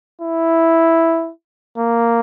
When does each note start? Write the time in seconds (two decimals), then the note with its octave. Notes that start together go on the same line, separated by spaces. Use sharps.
0.22 E4
1.78 A#3